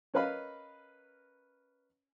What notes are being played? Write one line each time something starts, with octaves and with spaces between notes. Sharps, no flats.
C#4 A#4 B4 D#5 F5 B5